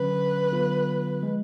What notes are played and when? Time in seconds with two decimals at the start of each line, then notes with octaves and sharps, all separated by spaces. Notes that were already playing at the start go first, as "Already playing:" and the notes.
Already playing: D3 F#3 C#4 B4
0.52 D3 F#3 B3 F4
1.23 F3 G#3